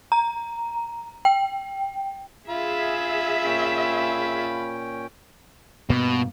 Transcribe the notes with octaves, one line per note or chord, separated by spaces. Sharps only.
A#5
G5
F4 G#4 E5 B5
A#2 C#4 G5
G2 B2 A#3 B3